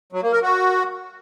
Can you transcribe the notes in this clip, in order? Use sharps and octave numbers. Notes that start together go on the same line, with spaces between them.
F#3
A#3
A#4
F#4